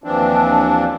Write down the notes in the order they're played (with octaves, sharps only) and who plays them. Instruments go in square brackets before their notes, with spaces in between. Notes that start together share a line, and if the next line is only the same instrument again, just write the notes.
[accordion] D#2 E3 F3 C4 D4